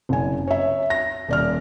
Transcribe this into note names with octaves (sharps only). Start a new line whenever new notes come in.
F#1 G#5
C#5 E5
A#6
D#1 D5 F6